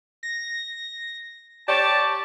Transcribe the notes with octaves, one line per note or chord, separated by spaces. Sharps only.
A#6
G4 C#5 D5 A5